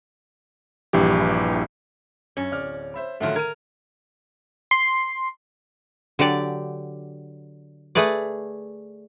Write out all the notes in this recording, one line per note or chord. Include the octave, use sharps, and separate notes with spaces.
A#1 G2 E3 G4
F#2 C#4
D1 D5 F6
C5 E5 B5
A2 D3 D#3 F3 F#3 A3
A#4 G#6 D#7
C6
D3 F#3 G4 D5
A3 G#4 B4 D5